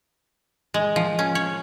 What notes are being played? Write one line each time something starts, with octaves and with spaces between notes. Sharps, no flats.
G#3
F3
C#4
C#5